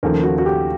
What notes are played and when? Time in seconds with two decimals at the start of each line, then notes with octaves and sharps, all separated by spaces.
0.03 D#2 C#3 F3 A3 A#4
0.23 F#4
0.38 F#4
0.46 G4